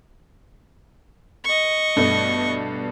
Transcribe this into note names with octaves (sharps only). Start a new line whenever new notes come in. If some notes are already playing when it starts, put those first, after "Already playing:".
D#5 C#6
G2 B2 A3